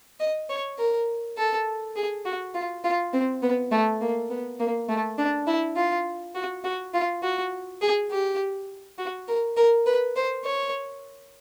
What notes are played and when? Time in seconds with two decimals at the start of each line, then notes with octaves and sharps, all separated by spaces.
0.20 D#5
0.49 C#5
0.78 A#4
1.38 A4
1.96 G#4
2.25 F#4
2.54 F4
2.84 F4
3.13 C4
3.42 B3
3.71 A3
4.01 A#3
4.30 B3
4.60 A#3
4.89 A3
5.18 D4
5.47 E4
5.76 F4
6.35 F#4
6.64 F#4
6.94 F4
7.23 F#4
7.82 G#4
8.11 G4
8.98 F#4
9.28 A#4
9.57 A#4
9.86 B4
10.16 C5
10.45 C#5